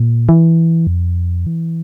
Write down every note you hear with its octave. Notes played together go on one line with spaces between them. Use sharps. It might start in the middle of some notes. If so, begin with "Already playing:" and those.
Already playing: A#2
E3
F2
E3